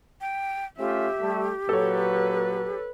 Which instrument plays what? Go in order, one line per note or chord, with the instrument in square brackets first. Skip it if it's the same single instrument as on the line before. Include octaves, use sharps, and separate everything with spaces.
[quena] G5
[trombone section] A3 C#4 F4 [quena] G4 [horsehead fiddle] E5
[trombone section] G3 A3
[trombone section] A#2 F#3 [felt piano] A4 C#5 [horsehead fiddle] B4